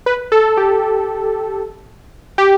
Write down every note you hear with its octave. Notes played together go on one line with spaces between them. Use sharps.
B4
A4
G4
G4